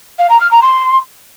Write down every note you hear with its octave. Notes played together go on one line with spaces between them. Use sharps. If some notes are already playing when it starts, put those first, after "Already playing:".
F5
A#5
F6
A#5
C6